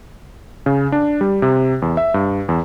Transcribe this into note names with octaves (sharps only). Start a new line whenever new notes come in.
C#3
D4
G3
C3
E2
E5
G2
E2